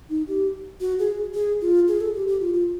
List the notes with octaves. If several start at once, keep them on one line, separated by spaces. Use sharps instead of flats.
D#4
G4
F#4
G#4
G#4
F4
G#4
A4
G4
G4
F4
F4